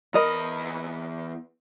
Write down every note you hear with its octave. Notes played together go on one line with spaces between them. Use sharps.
E2 A#4 D#5 B5